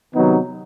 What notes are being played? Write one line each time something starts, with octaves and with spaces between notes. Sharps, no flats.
C3 D#3 F#3 B3 D#4